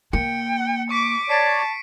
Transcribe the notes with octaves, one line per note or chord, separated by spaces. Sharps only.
A#3 G5 C#7
C#6 D6 B6 D7
C#5 D5 A5 B6 C7 D7